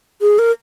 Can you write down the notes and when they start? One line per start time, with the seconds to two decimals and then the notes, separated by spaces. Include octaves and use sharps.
0.22 G#4
0.39 A#4